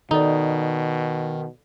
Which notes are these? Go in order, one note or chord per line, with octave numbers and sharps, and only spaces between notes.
B2 D#3 D#4 A4 D5